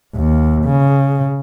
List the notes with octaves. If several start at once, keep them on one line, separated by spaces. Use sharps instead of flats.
D#2
C#3